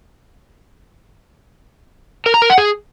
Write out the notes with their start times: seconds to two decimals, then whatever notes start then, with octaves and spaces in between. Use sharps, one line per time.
2.26 A#4
2.34 A#5
2.42 A#4
2.50 F#5
2.58 G#4